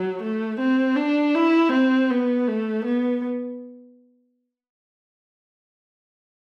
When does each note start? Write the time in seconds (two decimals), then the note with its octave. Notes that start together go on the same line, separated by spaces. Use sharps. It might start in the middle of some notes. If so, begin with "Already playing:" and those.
Already playing: F#3
0.22 A3
0.60 C4
0.96 D4
1.35 E4
1.72 C4
2.11 B3
2.48 A3
2.85 B3